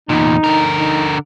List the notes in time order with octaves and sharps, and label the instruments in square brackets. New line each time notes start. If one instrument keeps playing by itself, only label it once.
[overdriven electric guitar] E2 A#2 [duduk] D#4
[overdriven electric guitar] D3 A#4
[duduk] D#4